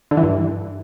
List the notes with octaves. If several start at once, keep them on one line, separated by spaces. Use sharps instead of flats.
D3
E3
G2